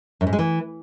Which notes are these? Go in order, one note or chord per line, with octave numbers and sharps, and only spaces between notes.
F#2
G#2
G#3
E3